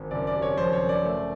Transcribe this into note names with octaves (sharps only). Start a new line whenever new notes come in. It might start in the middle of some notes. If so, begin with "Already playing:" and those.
Already playing: G#1
F#1 D5
D5
C3
C#5
F2 C5
C#5
F#1
D5
A3